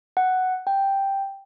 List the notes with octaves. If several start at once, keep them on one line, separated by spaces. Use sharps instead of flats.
F#5
G5